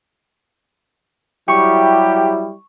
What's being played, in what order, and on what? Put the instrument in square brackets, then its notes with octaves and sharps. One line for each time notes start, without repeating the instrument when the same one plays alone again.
[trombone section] F#3 G3 E4 [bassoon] G4 [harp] C#6